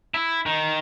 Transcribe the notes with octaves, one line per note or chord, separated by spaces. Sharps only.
E4
D#3